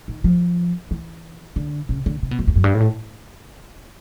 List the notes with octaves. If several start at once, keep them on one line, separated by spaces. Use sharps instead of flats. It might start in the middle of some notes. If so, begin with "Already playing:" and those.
D#3
F3
E3
D3
C#3
D3
C3
B2
F#2
F2
F#2
G2
A2